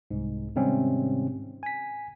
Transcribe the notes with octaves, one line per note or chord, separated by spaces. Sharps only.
C2 G#2
G#2 C3 D#3 G3 C4 C#4
G#5 B6